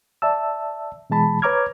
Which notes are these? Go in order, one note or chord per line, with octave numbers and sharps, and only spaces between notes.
D5 E5 A5 E6
B2 E3 G#3 A5 B5
B4 C#5 A#5 D6 F6 G#6